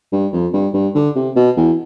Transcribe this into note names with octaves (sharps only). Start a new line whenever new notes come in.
G2
F2
G2
G2
D3
C3
B2
E2